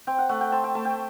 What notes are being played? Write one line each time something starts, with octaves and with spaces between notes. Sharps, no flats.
C4 G5
F#5
A3 F#5
G5
C4 A5
G5
A3 A5
G5